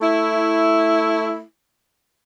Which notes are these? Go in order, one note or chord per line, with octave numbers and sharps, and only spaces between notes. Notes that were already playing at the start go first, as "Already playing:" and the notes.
A3 E4